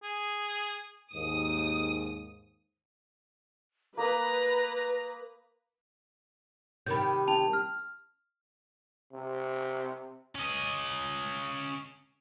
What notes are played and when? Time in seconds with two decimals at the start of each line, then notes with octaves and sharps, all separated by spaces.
0.03 G#4
1.13 D#2 G#2 D#6
3.97 A#3 B4 A#5 D#6
6.86 C3 D#3 G3 B5 G6
7.28 A5 F7
7.53 F6
9.13 C3
10.35 C#4 D#5